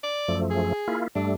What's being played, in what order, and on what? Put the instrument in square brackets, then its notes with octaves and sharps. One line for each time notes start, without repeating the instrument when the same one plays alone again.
[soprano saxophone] D5
[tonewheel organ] F#2 F3 A3
[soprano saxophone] G#4
[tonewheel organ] A#3 E4 F4
[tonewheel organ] G2 G3 A3 [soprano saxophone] D4